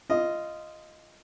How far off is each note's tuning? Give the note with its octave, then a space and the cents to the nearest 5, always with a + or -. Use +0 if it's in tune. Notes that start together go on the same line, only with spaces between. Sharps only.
F4 -15 D#5 +0